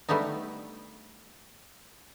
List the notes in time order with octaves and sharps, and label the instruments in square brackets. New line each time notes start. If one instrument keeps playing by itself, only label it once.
[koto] G3 A3 B3 D4 D#4